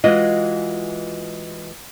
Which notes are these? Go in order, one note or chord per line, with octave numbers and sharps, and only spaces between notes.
E3 G#3 F4 F#4 D#5